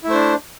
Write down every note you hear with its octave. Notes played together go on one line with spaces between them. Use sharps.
A3 D4 E4 C5